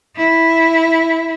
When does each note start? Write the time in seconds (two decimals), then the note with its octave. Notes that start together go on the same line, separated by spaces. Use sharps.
0.17 E4